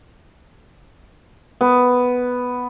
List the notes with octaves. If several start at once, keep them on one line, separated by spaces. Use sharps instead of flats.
B3